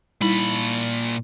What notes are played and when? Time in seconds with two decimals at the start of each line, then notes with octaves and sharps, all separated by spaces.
0.21 A#2 G3 D#4 E4 B5